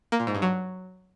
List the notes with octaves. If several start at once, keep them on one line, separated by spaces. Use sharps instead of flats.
A#3
A#2
G#2
G2
F#3